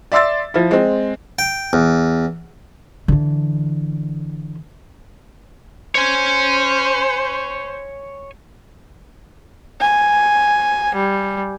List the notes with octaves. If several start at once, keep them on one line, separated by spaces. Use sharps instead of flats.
D5 E5 C6 E6 A6
F3 E4
G#3 C4
G5
E2
D3 E3
C5 C#5 G#5
G#5
G3